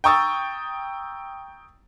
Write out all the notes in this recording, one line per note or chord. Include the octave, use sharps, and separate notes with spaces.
G5 A#5 C#6 D#6 E6 A6